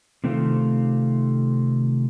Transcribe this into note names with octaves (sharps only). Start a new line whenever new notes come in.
C3 D#3 A3 C4 F4